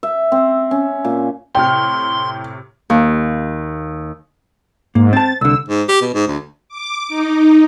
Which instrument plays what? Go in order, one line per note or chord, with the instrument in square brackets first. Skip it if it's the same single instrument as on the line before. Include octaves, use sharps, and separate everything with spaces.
[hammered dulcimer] E5
C4
C#4
A#2
[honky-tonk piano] A2 C3 F6 [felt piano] G5 [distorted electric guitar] C6
[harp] D#2
[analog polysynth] G#2 [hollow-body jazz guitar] A#3
[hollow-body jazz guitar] C4 A5 [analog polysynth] A6
[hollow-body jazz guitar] C2 D3 [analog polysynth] E6
[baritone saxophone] G#2
G4
B2
G#2
D2
[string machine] D6
D#4